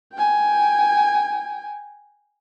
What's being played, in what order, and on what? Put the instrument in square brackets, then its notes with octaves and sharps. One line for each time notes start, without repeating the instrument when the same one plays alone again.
[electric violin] G5 G#5